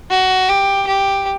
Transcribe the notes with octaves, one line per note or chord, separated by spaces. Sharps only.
F#4
G4
G4